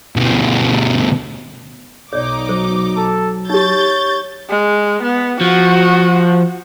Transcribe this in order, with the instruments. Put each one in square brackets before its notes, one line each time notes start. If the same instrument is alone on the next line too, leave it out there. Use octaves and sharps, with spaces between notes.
[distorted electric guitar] D2 B2
[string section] B1 D#4 D6 [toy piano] C#5 D5
[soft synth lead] F#3 [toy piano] C5
[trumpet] A4
[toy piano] D#4 G4 [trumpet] C#5 [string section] G6 A6
[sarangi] G#3
B3
[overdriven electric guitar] F3 [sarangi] F#4